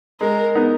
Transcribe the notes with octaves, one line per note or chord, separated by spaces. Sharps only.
G#3 A#4
B3 D#4